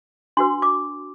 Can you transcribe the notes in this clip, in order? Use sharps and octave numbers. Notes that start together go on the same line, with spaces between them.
D4 F#4 B4 C6
D6